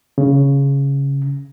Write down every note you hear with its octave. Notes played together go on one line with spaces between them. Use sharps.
C#3